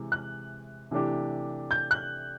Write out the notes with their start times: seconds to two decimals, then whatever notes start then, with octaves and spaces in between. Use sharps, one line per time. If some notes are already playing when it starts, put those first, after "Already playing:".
Already playing: C3 E3 G#3
0.12 F#6
0.91 C3 E3 A3 D4 G4
1.71 G6
1.91 F#6